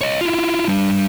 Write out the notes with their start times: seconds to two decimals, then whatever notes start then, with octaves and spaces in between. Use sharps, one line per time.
0.01 C#5 D#5
0.21 E4 F4
0.68 G3 D4